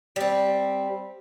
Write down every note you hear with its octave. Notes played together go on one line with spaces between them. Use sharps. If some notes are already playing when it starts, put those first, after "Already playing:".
G3 C4